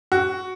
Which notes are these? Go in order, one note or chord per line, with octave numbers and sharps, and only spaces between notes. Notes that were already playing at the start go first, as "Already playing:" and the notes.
F#4